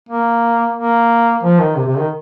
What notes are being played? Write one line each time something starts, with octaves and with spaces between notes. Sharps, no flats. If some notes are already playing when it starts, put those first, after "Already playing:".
A#3
A#3
F3
D#3
C3
C3
D#3